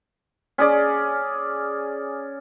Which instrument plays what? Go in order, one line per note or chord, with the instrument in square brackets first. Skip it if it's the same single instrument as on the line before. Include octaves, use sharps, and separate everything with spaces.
[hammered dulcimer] C#4 G#4 D5